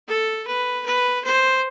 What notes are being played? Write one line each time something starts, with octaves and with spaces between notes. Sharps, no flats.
A4
B4
B4
C5